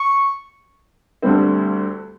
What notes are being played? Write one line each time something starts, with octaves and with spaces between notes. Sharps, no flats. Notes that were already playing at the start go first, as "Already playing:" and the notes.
Already playing: C#6
D2 D3 G3 C4